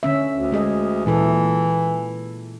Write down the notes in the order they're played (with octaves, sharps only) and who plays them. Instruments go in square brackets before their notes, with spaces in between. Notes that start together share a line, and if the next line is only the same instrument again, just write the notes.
[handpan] D3 C#4 E5
[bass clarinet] D2
[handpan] G#3 G#4 D#5
[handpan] A#2 E4 A4 [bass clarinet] E3